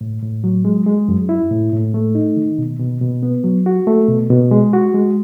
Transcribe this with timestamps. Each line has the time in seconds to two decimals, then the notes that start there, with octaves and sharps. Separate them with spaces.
0.01 A2
0.22 A2
0.44 F#3
0.65 G#3
0.86 G#3
1.08 F#2
1.29 E4
1.51 A2
1.73 A2
1.94 A3
2.15 D#4
2.37 D#3
2.58 B2
2.79 B2
3.01 B2
3.23 B3
3.44 F#3
3.66 F#4
3.87 A3
4.08 B2
4.30 B2
4.51 G#3
4.73 F#4
4.94 G#3